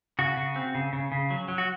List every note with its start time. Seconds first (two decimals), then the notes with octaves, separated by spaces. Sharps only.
0.19 C#3 F#4
0.37 C#3
0.56 C4
0.75 C#3
0.93 C#3
1.12 C#3
1.30 F#3
1.48 F#3
1.58 F#4